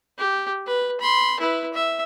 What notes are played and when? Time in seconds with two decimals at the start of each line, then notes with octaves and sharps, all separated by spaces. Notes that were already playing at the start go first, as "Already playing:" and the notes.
0.18 G4
0.67 B4
1.01 B5 C6
1.40 E4 B4
1.73 E5